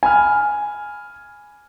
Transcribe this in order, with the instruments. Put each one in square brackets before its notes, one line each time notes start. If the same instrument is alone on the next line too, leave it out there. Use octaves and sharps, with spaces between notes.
[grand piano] G#5 B5 F6